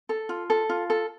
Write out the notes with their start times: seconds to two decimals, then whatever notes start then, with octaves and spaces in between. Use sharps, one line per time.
0.09 A4
0.29 F4
0.50 A4
0.69 F4
0.90 A4